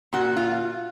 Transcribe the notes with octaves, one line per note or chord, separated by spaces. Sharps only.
A#2 F#4
F4